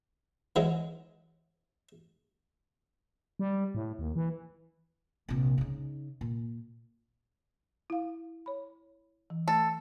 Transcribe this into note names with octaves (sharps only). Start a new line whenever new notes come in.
E3 F#3 G#3
G3
A2
D#2
E3
A#1 C3
C#3 D#4
A#2
E4 F5
C#5 B5
E3
A3 A4